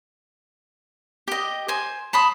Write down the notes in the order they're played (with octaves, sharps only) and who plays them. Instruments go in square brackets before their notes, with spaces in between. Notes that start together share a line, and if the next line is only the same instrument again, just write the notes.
[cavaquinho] G4 D#5
C5 G#5
A5 B5 C6 D#6